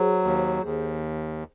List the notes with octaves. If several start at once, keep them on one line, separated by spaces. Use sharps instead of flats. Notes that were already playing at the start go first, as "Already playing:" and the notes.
Already playing: F#3 G#4 C5
D#2
D#2